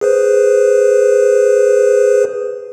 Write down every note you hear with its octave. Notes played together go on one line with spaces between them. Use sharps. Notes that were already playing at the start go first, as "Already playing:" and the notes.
G#4 B4 C5